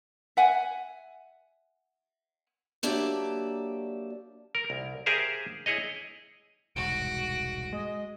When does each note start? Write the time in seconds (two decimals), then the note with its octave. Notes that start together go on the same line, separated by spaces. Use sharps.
0.37 E5 F#5 G#5
2.83 F#3 A#3 D4 G4 D5 E5
4.55 A#4
4.70 C2
5.06 G4 G#4 A#4 C5 E5 F5
5.66 E4 G#4 C#5 D#5
6.76 E1 C2 G#2 F#4 D7
7.73 G#3 D#5